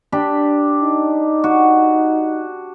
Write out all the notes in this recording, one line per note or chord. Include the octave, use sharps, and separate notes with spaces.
D4 G4 B5
D#4
F#4